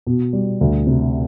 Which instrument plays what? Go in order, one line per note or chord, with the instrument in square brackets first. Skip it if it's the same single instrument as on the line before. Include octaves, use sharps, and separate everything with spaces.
[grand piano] B2
G3
D2
C3